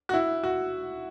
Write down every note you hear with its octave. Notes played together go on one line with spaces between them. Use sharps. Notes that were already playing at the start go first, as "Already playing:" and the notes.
F#4
E4
F#4